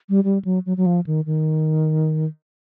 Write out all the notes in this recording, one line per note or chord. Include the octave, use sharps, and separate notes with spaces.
G3
G3
F#3
F#3
F#3
F3
D#3
D#3